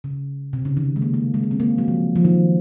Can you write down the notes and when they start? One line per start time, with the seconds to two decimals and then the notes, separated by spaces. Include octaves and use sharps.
0.04 C#3
0.53 C3
0.65 C#3
0.77 D#3
0.96 G#3
1.02 A#3
1.14 A#3
1.34 G#3
1.43 A#3
1.51 C4
1.60 A#3
1.78 F#3
1.88 F3
2.16 F3
2.25 D#3